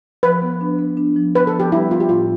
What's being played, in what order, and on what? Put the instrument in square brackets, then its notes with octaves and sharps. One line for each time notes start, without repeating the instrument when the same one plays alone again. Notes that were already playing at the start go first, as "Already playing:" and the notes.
[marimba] F3 [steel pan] B4
[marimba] B3
D4
B3
D4
F3
[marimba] B3 [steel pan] B4
[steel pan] A4
[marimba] F3
[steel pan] G4
[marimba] G3 [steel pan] E4
[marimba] B3 [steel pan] F4
[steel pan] G4
[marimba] A2 [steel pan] F4